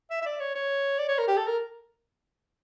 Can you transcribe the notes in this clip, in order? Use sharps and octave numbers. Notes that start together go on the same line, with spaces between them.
E5
E5
D5
C#5
C#5
D5
C#5
A#4
G4
A4
A#4